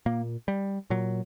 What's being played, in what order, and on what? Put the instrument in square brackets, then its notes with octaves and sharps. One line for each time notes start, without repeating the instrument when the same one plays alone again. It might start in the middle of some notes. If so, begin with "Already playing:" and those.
[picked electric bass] A#2 A#3
G3
A#2 F#3